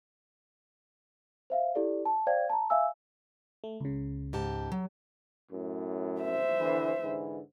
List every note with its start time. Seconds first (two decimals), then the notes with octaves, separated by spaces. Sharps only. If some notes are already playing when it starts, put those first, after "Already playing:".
1.50 C5 E5 F5
1.75 E4 G4 A4 D5
2.05 A5
2.27 C5 D5 F5 G5 G#6
2.50 A5 A#5
2.70 E5 F5 G#5 E6
3.64 A3
3.81 C#2 C#3
4.33 G#2 G4 A5
4.72 F#3
5.52 F#2 A2
6.21 C5 E5
6.59 D3 E3
7.02 G#2 D3 E3